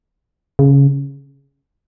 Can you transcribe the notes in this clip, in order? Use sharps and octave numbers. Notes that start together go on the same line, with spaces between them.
C#3